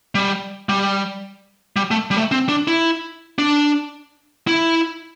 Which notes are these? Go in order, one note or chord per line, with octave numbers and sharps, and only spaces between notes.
G3
G3
G3
A3
G3
A3
C4
D4
E4
D4
E4